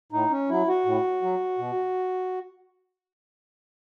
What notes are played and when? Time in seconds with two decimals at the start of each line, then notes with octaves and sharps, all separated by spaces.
0.12 A2 D#4
0.31 C#4
0.49 F#3 E4
0.68 F#4
0.85 A2
1.22 F#3
1.58 B2